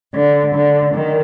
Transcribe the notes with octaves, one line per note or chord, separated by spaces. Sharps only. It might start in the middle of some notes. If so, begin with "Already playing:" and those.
D3
D3
D#3